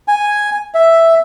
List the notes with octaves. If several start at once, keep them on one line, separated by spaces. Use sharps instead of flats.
G#5
E5